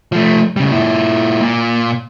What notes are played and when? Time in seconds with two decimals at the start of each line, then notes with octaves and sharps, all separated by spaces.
0.12 F3 A3
0.56 C#3 G3
0.72 A#2 E4
1.41 A#2